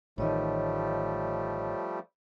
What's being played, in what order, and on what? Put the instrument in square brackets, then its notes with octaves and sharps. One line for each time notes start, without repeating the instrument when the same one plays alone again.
[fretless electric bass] A1 D#3 [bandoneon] F3 G3 A3 [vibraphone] C#5 D#5